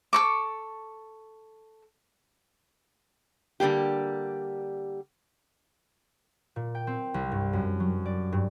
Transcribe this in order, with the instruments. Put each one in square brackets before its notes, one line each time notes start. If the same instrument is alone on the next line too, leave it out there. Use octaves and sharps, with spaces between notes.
[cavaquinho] A4 C#6 D6
[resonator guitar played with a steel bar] D3 G3 A#3 G4
[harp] A#2
G5
C4
C2
G2
F#2
F#3
D5
G2